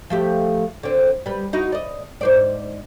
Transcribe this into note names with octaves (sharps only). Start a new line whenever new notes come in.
F3 A3 G4
D3 C4
G3 B4
D#4 E4 F#4
D5 D#5
G#2 C5 D5